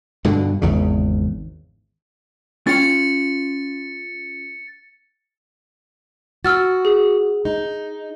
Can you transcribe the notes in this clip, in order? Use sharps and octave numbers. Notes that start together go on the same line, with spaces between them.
G2 B2 D3
G#1 E2 C#3
C#4 F4 G5 A6 C#7
F#4 E6 F6 A6
G#4
D#4